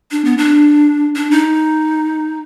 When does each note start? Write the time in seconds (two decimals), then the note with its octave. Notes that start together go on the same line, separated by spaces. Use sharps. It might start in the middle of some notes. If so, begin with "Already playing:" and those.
0.11 D4
0.25 B3
0.38 D4
1.16 D4
1.31 D#4